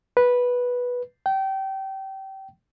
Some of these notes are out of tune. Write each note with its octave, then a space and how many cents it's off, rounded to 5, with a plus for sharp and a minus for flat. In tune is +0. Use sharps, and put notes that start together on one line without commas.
B4 -10
G5 -25